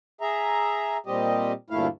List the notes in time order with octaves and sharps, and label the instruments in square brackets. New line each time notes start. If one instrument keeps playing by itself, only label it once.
[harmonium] G#4 E5 A#5
A#2 G3 C4 G4 D#5
D2 G2 A#2 A3 E4 F5